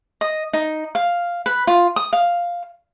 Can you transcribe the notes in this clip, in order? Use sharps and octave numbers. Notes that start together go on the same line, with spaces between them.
D#5
D#4
F5
B4
F4
D#6
F5